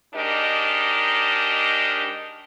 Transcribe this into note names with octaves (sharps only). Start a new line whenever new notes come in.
G#2 D4 D#4 G4 A#4 D#5